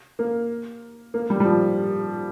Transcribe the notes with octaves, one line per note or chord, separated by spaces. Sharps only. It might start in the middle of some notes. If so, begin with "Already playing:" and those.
A#3
A#3
G3
G3
F3